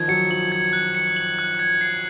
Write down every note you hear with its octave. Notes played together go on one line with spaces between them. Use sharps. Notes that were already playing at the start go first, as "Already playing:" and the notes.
Already playing: D#3 F3 G#6
F#3 C#7
F3 F#7
G#6
F#6
C#7
F#7
F#6
G#6
C7